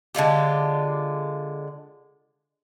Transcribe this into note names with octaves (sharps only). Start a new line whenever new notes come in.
D3 G#3 F4 G4